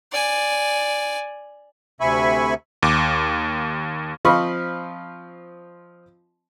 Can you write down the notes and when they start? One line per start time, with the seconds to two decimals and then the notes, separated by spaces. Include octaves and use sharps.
0.12 D5 G#5
2.01 D2 C3 E5 G#5 B5 C#6
2.83 D#2 D6
4.25 F3 C4 F4 D#5 B5 C#6